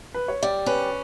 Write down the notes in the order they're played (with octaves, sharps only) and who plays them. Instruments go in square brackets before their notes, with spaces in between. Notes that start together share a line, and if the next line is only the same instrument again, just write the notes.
[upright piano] B4
C#5
[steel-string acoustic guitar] G3 [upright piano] D5
[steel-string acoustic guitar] C#4 [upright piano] B4